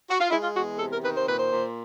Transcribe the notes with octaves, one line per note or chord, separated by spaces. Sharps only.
F#4
F4
G#3 E4
F4
E2 F#4
C3 A4
A#4
D#3 B4
C5
A#2 B4
C5
A#2